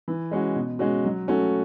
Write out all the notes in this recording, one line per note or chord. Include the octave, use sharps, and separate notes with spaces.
E3
G#3 C#4 F#4
B2
G#3 C#4 F#4
F#3
A3 C#4 F#4